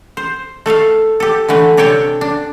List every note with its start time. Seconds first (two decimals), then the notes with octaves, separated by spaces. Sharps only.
0.17 C5
0.66 A3 A4 E5 F5
1.20 G4 A4
1.49 D3 E3 A3 B4
1.77 C3 D4 C#5 E5 G5 A5
2.21 D4